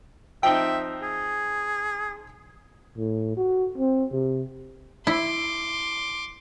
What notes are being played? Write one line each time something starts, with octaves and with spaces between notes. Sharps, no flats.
F3 C4 D#4 E5 G5
G#4
A2
F#4
C4
C3
E4 C6 D6